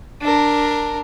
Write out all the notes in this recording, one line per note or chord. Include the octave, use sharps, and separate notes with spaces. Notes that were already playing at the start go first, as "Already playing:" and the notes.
D4 A#4